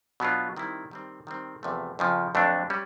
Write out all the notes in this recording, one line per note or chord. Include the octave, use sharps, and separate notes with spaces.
B2 F#3 B3 D4 F4
D#3 G3 C4 E4
D#3 G3 C4
D#3 G3 C4
E2 C3 F3 A3
F2 C#3 F3
F2 D3 F#3 A3 D4
G3 C#4